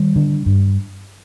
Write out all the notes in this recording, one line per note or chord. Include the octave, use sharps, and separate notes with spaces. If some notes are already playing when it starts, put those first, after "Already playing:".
Already playing: D#3 G3
D3
G2